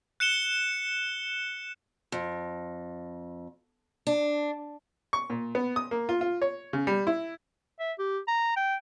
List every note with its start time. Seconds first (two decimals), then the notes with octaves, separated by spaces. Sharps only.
0.20 F#6 C#7 E7 G7
2.12 F2
4.07 D4
5.13 C#6
5.30 A#2
5.55 B3
5.76 D#6
5.91 A#3
6.09 F4
6.21 F4
6.42 C#5
6.73 C#3
6.87 G3
7.07 E4
7.80 E5
7.99 G4
8.28 A#5
8.57 G5